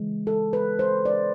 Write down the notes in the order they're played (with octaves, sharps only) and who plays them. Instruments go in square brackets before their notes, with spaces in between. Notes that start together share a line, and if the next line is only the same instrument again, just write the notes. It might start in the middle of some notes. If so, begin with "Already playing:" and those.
Already playing: [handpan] C#3 E3 G#3
A4
B4
C5
D5